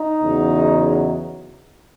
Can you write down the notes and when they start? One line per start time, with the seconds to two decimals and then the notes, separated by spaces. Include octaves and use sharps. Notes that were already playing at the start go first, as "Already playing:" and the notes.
Already playing: D#4
0.23 E2 C#3 F#3